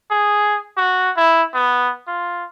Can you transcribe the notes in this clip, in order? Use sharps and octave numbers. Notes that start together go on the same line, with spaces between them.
G#4
F#4
E4
B3
F4